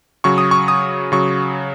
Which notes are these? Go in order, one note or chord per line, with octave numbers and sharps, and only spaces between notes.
C#3 F#3 C#6
D#6
C#6
D#6
C#3 F#3 C#6